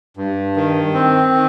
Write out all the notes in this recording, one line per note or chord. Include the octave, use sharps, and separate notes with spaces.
G2
D#3
C4
D#3